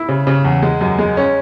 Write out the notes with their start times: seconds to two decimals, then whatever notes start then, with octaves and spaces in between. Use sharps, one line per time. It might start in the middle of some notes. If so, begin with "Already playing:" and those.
Already playing: E4
0.09 C#3
0.27 C#3
0.45 E2
0.63 G#3
0.81 F#2
0.99 G#3
1.17 C#4